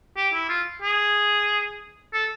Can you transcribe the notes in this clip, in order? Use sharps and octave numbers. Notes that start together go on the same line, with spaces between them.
G4
E4
F4
G#4
A4